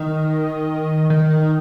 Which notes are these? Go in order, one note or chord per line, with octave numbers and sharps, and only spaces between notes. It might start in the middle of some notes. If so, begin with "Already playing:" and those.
Already playing: D#3
D#3